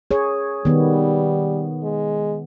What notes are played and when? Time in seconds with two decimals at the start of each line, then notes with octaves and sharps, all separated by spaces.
0.11 G#4 C#5
0.65 D#3 G3 B3
1.83 G#3